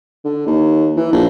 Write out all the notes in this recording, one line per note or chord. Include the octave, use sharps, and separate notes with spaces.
D3
D#2
E3
A#1